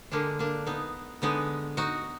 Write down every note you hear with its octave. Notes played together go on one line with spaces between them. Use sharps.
D3 G#3 A#3 D4
A#3 D4
B3 D#4
D3 G#3 B3 D#4
D#4 F#4